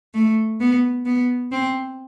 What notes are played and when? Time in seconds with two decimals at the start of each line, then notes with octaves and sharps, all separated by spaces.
0.14 A3
0.61 B3
1.06 B3
1.52 C4